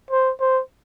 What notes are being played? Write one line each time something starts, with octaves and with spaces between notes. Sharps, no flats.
C5
C5